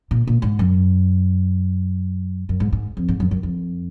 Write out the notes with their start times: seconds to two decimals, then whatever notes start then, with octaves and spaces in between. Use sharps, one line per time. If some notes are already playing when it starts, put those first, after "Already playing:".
0.11 A#2
0.27 A#2
0.42 G#2
0.59 F#2
2.49 F#2
2.60 G#2
2.73 G#2
2.97 F2
3.08 G#2
3.20 F#2
3.31 F#2
3.43 F2